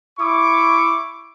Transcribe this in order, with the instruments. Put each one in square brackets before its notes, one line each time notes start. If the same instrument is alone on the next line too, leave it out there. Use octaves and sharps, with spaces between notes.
[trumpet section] E4 C#6 D6